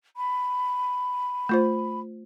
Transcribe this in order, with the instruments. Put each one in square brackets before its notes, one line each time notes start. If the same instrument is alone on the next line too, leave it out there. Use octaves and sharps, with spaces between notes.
[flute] B5
[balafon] A3 F4 C5